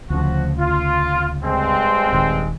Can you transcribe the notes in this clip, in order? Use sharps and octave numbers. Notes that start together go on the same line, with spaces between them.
D2 C#3 F3 F#4
F4
G2 G#3 C4
D#1 D#3